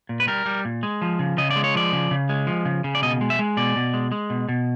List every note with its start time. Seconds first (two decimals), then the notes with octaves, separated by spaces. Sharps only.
0.09 A#2
0.20 B4
0.27 G3 A#4
0.46 G3
0.65 A#2
0.83 G#3
1.02 F3
1.19 C#3
1.38 C#3 D#5
1.51 D5
1.56 G#3
1.64 C#5
1.74 F3 D5
1.93 C#3
2.11 C#3
2.29 G#3
2.47 F3
2.65 C#3
2.84 C#3
2.95 D5
3.02 B2 D#5
3.21 G#3
3.30 E5
3.39 G#3
3.57 B2 D5
3.76 B2
3.94 G#3
4.12 G#3
4.30 B2
4.49 B2